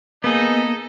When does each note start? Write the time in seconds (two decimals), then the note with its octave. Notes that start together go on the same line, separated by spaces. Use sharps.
0.24 A#3 B3 D#4 G#4 A4 D#5